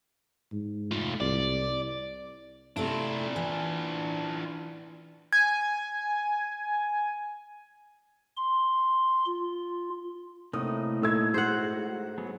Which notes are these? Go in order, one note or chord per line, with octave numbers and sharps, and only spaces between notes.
G#2
A3 F4
C2 D5
C3 A3 D4 E4 F4
E3
G#5 G#6
C6
F4
A2 C3 A#3 D#4 D#6
A#2 A3 D#4 E6 G#6
G#2 F#4 C5 F#5
F#3 B3 G#4